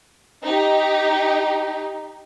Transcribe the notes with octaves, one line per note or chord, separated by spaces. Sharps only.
D#4 G4